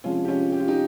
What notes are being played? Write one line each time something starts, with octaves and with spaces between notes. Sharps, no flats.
C3 F3 G#3 C#4 F4
G4
C#4 F4
G4
F4
D#4 G4